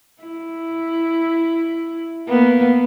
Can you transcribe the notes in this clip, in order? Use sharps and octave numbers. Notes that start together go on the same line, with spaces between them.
E4
A#3 B3